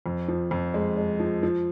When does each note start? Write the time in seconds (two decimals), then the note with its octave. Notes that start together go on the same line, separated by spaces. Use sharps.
0.06 F2
0.28 F3
0.51 F2
0.74 G#3
0.97 G#3
1.20 F3
1.43 F3